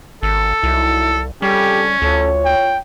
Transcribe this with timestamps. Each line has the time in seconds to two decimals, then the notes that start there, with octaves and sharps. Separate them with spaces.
0.23 G#1 A4
0.63 C2 F#3 D#4 E4
1.42 F2 C#3 G3 C#4 G4 A4
2.02 D2 F4 A4 C#5
2.45 G5